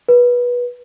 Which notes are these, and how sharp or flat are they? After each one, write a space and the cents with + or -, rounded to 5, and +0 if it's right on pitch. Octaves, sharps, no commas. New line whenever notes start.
B4 -20